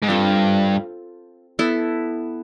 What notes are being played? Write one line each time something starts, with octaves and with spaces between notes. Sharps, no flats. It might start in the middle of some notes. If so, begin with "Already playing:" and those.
G#2
G2 C4 F4 A4
B3 E4 A4